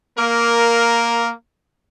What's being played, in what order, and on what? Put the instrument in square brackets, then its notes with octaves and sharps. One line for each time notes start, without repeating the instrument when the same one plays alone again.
[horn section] A#3 A#4